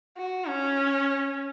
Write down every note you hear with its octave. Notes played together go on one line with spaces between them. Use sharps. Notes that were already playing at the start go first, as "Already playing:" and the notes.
F#4
C#4